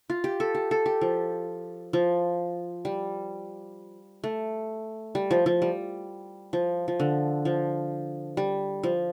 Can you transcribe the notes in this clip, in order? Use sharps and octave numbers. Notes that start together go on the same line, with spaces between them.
F4
G4
A4
G4
A4
G4
F3
F3
G3
A3
G3
F3
F3
G3
F3
F3
D3
F3
G3
F3